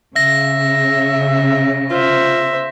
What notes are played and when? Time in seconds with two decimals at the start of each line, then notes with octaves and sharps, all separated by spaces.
0.16 C#3 E5 A#6
1.91 F4 C5 E5